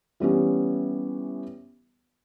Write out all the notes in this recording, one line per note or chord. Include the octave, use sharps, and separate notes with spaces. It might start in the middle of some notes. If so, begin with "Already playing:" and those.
E3 G3 B3 C#4